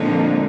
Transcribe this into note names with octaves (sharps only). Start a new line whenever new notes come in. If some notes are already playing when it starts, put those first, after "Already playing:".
Already playing: A#2 D3 F3 G#3 C4 D#4